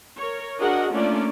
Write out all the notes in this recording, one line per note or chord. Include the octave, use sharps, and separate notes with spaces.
A#4 C#5
D4 F#4 G#4 A#4 D#5 F#5
A3 A#3 C#4 D4 F4 D5